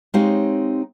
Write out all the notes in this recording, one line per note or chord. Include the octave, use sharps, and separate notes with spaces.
G#3 C4 D#4 G4 C#5 F5